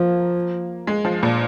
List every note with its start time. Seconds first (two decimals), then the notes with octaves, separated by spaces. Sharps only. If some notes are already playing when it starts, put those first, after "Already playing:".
Already playing: F3 A#3
0.87 G#3
1.05 F3
1.23 A#2